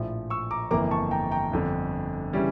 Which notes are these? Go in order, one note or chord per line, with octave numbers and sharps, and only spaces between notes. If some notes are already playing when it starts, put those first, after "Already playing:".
Already playing: A#1 A2 F3
C#6 E6
A#5 D6
G1 F2 E3 A#3 A#5 D6
A5 C#6
G5 A#5
G5 A#5
G1 F2 D3
C#3 E3 G3 C#4